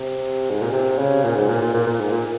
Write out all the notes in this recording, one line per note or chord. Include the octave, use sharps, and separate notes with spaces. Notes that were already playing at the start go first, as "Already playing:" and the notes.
Already playing: C3
G#2
A#2
C3
C#3
A#2
G#2
A#2
A#2
A#2
A#2
G#2
A#2